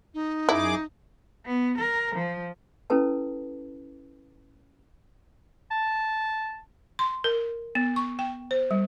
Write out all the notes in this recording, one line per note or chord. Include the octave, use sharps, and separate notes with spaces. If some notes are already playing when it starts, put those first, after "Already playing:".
D#4
F#2 E4 G#4 D6
B3
A#4
F3
C#4 E4 A4 B4 A5
A5
C6
A#4
B3
C#6
G5
C5
G3